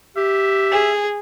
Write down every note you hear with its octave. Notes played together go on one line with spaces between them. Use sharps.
G4 E5
G#4